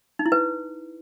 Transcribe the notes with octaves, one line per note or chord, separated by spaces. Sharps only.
D#4
E4
B4